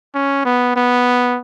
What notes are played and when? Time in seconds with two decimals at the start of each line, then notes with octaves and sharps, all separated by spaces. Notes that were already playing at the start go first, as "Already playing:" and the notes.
0.14 C#4
0.45 B3
0.76 B3